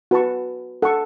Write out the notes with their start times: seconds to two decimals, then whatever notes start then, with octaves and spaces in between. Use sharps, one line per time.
0.11 F#4 B4 A5 C#6
0.82 A4 F#5 A5 C#6